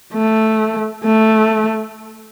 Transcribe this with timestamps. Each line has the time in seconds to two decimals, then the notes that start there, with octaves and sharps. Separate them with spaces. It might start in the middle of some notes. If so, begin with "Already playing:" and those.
0.13 A3
1.04 A3